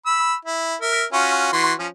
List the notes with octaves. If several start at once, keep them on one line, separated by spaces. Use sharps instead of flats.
B5 E6
E4
A#4 E5
C#4 F4 F#4
E3 F#4 C6
F3 C#4